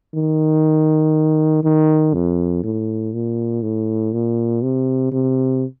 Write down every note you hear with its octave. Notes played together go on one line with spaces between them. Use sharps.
D#3
D#3
F2
A2
A#2
A2
A#2
C3
C3